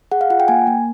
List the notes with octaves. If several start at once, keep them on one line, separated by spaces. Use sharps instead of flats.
G#4 F#5
F5
F4 F#5
G5
A#3 G#5
A#3